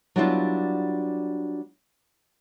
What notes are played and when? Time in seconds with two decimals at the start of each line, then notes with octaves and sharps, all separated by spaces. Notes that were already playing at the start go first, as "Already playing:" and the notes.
0.16 F#3 G3 B3 D4 E4 F4